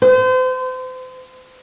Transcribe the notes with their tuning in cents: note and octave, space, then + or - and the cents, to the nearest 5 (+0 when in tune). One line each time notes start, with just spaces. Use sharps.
C5 -35